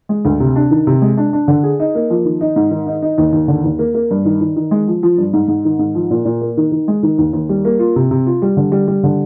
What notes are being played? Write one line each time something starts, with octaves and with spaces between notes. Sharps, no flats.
G#3
D2
C3
D4
D#3
C3
G#3
D4
D4
D3
G#4
D#4
A#3
F3
D#3
D#4
G#2
D#3
D#4
D#4
D#2
D#2
D3
D#2
A#3
A#3
G2
D#3
D#3
D#3
G#3
F3
F3
G2
G#2
G#2
D#3
G#2
F3
A#2
A#2
A#3
D#3
D#3
G#3
D#3
D#2
D#2
G3
A#3
F4
C3
C3
F4
G3
D3
G3
G3
D3